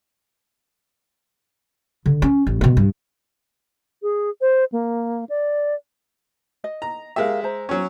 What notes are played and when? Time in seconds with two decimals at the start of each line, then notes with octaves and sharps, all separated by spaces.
2.06 D3
2.22 C#4
2.47 A1
2.61 B2 B3
2.77 G2
4.02 G#4
4.41 C5
4.72 A#3
5.29 D5
6.64 D#5
6.82 A#5
7.16 G#3 G4 A#4 E5 F5
7.44 C5 A#5
7.69 F#3 C#4